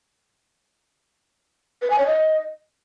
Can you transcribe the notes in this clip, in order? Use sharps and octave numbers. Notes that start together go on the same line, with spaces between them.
B4
G#5
C#5
D#5